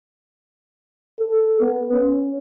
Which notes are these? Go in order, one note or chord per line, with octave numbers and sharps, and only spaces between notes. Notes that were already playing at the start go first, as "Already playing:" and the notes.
A4
B3
C#4